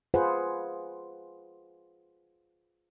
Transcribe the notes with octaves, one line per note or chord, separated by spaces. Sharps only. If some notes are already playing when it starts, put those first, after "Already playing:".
F4 G#4 B4 C5 F#5